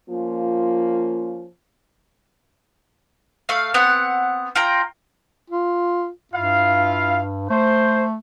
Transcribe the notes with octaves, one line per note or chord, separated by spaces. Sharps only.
F3 A#3 C#4 F4
A3 F5
B3 C4 F#5
F4 G5 A#5
F4
G2 E4 F4 F5
A3 C5